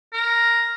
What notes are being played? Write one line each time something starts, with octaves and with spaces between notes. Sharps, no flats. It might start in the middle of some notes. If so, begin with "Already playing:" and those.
A#4